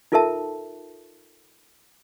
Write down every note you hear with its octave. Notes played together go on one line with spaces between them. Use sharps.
D#4 F4 A4 A#4 E5 A5